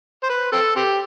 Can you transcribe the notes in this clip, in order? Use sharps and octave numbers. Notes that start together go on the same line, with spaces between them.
C5
B4
C4 A4
C4 G4